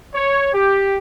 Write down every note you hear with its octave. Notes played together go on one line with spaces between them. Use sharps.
C#5
G4